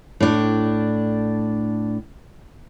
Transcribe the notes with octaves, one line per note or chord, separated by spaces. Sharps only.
A2 D4